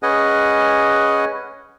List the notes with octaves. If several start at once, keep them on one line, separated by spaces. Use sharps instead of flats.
C#4 G#4 B4 D#5 F#5 G#5